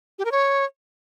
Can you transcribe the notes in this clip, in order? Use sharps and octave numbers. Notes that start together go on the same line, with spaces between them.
G4
A#4
C#5